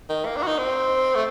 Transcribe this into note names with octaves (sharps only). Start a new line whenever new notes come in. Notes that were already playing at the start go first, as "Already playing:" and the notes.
D#3
A#3
D4
F#4
D#4
C4
A3